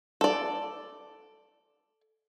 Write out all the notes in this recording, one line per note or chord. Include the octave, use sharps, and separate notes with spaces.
A4 D5